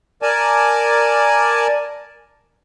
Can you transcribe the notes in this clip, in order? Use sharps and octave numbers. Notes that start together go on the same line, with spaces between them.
A#4 D5 G#5 A5